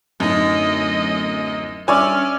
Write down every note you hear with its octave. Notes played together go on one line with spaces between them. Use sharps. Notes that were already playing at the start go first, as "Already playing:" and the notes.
D1 F#2 D#4 D#5
G2 C#4 C#5 D5 E5 G#5 F6